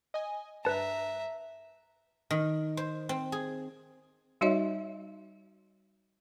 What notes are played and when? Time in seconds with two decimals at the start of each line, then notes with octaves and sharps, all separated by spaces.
0.14 D#5 G#5
0.65 G2 B4 E5 A5 A#5
2.31 D#3
2.77 C5
3.09 C4
3.32 G#4
4.41 G3 D#4 F#4 C#5 D#5 E5